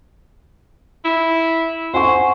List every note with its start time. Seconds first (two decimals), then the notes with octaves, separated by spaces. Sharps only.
1.05 E4
1.94 C5 F#5 G#5 C#6